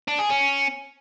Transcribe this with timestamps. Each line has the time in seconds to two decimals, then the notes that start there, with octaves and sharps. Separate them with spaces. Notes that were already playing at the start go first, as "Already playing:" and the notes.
0.08 D4
0.19 G#4
0.30 C#4